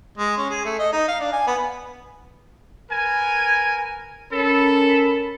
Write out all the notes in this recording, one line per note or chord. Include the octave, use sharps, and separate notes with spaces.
G#3
C#4
G#4
A3
D#5
D#4
F5
D4
G#5
B3
A#4 B4 G#5
C#4 A4 A#4 B5